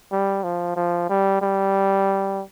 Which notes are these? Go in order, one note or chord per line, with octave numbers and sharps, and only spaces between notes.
G3
F3
F3
G3
G3